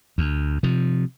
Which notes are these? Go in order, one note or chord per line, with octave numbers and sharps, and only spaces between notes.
D2
C3 F3